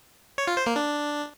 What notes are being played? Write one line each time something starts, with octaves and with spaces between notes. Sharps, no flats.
C#5
F4
C5
A#3
D4